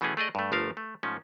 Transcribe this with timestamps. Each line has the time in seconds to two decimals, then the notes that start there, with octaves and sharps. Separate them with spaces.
0.01 B2 E3 A3 B3 C#4 G#4
0.17 A3 G#4 D5 D#5
0.35 G2 A3
0.52 G1 F3 A3 A#4 F5
0.77 A3
1.03 G#2 F3 A3 C#4